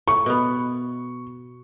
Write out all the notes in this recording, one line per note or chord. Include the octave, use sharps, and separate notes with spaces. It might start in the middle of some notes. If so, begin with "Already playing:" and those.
A2 C#6
B2 B3